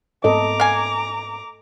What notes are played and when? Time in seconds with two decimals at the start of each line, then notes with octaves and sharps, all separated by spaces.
0.24 G#2 B3 C4 A4 D#5 A#5 D6
0.60 F5 G#5